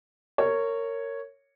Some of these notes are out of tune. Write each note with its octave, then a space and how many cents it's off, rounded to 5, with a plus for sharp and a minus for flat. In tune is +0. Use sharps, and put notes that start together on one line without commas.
A#4 -25 C#5 +0